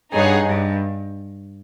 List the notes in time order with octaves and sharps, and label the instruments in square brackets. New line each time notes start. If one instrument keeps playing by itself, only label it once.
[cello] G2 [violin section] D#4 G#4 C#5 F#5
[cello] G2